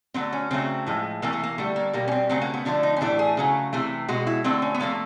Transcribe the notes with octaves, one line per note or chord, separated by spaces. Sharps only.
D3 F#3 A3 C4
C#4
C#3 F#3 A3 C4
A2 F3 G#3
C3 E3 A3 A#3
A3
A#3
D3 G3 A3
A#3
B2 G3 A#3
C#4
C4
C#3 F#3 A3 C4
A#3
B3
D3 F3 A3 D4
D#4
C#4
A2 E3 A3 D4
G#4
C#3 F#3 A3
C3 E3 A3
B2 G#3 F#4
E4
D3 F#3 A3 C4
C#4
B3
C3 F3 A3 A#3